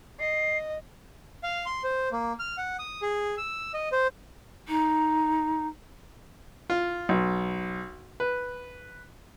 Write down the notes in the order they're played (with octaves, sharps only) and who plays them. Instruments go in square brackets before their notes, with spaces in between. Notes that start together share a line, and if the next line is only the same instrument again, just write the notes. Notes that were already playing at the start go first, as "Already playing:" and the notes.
[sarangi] D#5 [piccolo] C7
[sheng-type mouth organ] F5
C6
C5
A#3
F6
F#5
D#6
G#4
E6
D#5
C5
[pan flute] D#4
[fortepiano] F4
B1
B4